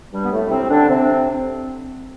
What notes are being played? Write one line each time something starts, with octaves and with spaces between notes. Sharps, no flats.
G2 G3
B3
A2 A3
C3 C4
D3 D4
C3 C4